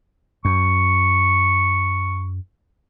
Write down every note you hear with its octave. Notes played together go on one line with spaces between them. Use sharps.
F#2 C#6